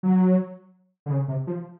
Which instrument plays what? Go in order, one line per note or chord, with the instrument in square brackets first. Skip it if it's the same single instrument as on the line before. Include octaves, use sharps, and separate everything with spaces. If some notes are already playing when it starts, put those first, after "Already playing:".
[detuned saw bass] F#3
D3
C#3
C3
F3